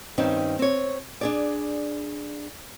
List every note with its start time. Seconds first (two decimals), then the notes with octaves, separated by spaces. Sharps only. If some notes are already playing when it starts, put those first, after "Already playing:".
0.18 G2 D#3 C4 C#4 D#4
0.59 C4 C#5
1.21 D4 G#4 D5